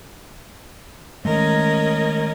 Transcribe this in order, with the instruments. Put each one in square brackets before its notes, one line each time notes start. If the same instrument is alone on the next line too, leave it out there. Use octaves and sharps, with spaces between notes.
[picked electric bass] D#3 G#3 A3 [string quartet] C#4 A#4 D#5